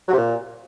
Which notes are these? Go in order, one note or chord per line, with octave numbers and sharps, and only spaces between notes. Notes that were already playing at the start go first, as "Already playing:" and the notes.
F#3
C3
A#2